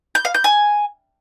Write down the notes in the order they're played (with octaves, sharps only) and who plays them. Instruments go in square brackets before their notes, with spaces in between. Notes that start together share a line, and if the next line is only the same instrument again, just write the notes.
[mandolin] G6
F5
G6
G#5